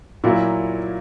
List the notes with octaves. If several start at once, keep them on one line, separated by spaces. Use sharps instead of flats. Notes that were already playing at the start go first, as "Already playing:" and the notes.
A#2 F#3 A#3 E4